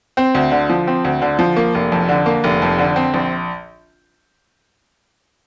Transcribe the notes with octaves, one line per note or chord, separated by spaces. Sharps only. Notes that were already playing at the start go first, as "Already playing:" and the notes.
C4
D2
D3
F3
C4
D2
D3
F3
A#3
F1
F2
D3
A#3
F1
F2
D3
C4
A#1